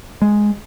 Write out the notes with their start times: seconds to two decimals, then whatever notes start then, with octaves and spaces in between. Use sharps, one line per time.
0.22 G#3